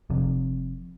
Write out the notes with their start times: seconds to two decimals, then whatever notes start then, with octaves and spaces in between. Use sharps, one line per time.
0.10 F1 F2 C3